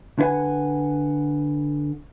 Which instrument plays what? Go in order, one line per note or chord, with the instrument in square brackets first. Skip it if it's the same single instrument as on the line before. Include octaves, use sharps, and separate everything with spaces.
[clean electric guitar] D3 E4 B4 F#5 G#5